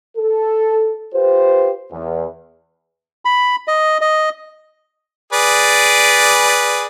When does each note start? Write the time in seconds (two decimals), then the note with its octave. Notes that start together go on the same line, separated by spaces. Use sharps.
0.18 A4
1.14 F4 G4 B4 C5
1.92 E2
3.25 B5
3.68 D#5
4.01 D#5
5.33 G#4 B4 D5